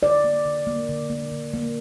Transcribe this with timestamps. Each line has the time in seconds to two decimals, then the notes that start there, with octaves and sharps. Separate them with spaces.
0.02 D3 D5
0.24 A#3
0.46 D3
0.67 A#3
0.89 D3
1.10 A#3
1.32 D3
1.54 A#3